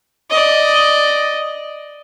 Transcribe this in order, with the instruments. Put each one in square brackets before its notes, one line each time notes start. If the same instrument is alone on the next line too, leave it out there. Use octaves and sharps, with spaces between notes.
[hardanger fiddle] D5 D#5